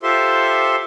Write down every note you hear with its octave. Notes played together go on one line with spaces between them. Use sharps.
F4 G4 A4 C5 E5 C6